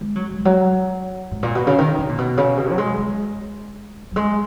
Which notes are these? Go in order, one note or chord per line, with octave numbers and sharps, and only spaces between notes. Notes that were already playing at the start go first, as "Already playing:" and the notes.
G#3
F#3
G#3
E3
F#3
G#2
A#2
B2
C#3
D#3
C#3
A#2
B2
C#3
B2
F#3
G#3
G#3
F#3
G#3